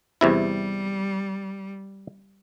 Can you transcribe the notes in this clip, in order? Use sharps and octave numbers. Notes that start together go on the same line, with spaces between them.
E2 C3 G3 E4